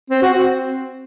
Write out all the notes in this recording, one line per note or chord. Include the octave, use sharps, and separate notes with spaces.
C4
F#4
C4